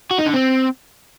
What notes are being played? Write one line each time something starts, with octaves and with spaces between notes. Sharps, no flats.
F#4
D#4
D3
C4